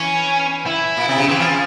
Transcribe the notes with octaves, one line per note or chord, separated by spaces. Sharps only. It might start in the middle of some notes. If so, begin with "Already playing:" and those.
Already playing: E3 C#4
E4
A#2
C3
C#3
E3 C4
F3 C#4